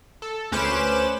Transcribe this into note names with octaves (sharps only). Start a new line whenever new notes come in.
A4
D2 C#4 B4 C5 D6 E7